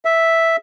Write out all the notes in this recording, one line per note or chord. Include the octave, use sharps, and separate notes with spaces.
E5